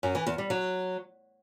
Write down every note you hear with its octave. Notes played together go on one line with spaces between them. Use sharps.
F#2
E3
E2
G3
F#3